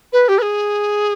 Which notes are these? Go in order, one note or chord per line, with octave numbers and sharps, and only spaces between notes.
B4
G4
B4
G#4